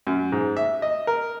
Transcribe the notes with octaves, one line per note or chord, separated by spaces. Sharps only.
F#2
G#2
E5
D#5
A#4